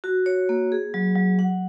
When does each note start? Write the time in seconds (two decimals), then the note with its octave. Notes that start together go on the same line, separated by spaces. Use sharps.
0.04 F#4
0.26 C#5
0.49 A#3
0.72 G#4
0.94 F#3
1.15 F#3
1.39 F#5